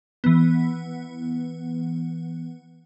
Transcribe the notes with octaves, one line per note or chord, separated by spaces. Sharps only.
E3 B3